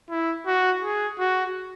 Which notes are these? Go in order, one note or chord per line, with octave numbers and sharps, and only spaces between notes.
E4
F#4
G#4
F#4